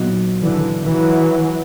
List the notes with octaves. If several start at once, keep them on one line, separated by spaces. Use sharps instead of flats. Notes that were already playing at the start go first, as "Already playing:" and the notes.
Already playing: A#2 F#3 B3 D#4
D3 E3
E3 F#3